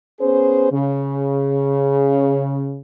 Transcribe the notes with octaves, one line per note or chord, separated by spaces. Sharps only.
B3 C#4 G#4 C5
C#3